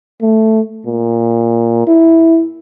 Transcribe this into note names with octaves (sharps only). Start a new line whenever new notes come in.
A3
A#2
E4